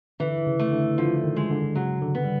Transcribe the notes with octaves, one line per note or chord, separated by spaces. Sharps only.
D3 E3
C#3
A3
D3
D3 F3
D#3
G#3
D3
C#3 F#3
D3
B3
G3